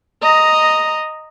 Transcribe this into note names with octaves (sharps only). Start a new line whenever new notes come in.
D#5 A#5